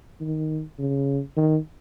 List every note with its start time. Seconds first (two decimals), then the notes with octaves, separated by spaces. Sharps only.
0.21 D#3
0.79 C#3
1.37 D#3